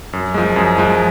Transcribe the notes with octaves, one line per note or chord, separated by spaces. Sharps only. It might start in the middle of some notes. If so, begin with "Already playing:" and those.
F#2
F3 G#3
F#2
F3 G#3